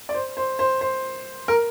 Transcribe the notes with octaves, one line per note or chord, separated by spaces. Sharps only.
D5
C5
C5
C5
C5
A#4